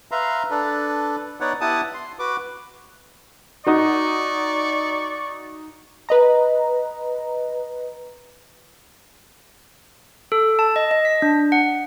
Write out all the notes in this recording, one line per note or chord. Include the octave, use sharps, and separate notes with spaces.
B4 E5 F5 A#5 C6
D4 A4 B4
B3 D#4 B4 C#5 D5 F#5
B3 E4 G4 F#5 A5 D#6
C6
F#4 B4 D6
D#4 F#4 D5 C#6
B4 D#5 A#5
A4
A5
D#5
D#5
B6
D4
F#5